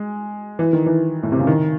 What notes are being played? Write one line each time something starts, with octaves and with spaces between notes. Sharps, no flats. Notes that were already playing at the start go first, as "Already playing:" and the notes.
Already playing: G#3
E3
D#3
E3
A2
C3
C#3
D#3